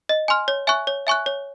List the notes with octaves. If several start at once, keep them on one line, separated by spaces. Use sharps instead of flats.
D#5
G#5 C6 F6
C#5
E5 G#5 C#6 F#6
C#5
E5 G#5 C#6 F#6
C#5